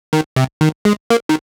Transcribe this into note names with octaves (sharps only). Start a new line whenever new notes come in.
D#3
C3
D#3
G#3
A#3
D#3